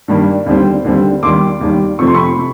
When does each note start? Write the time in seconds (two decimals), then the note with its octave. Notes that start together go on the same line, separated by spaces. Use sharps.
0.08 G2 D#3 G3 A#3
0.46 D#2 D3 G3 C4
0.85 D#2 D3 G3 C4
1.23 D#2 D#3 G3 C6 D6
1.61 D#2 D#3 G3
1.99 F2 C3 F3 A3 C4 C#6
2.07 C6
2.15 B5 C#6
2.37 C3